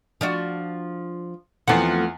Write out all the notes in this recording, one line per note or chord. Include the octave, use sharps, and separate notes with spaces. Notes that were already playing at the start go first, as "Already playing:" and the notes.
F3 D4 F#4
E2 F3 A3 C4 F#5